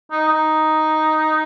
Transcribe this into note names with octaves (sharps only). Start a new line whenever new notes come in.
D#4
D#4